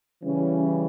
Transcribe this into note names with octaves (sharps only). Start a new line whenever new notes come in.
C#3 E3 G3 C#4